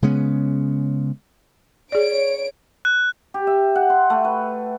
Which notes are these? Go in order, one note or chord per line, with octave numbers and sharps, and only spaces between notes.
C#3 G#3 B3 C#4
G#4 C#5 D5 D7
F#6
G4
E5
F#5
C6
A3
B4